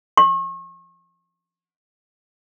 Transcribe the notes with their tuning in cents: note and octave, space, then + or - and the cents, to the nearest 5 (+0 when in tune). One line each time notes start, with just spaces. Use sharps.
C#6 -40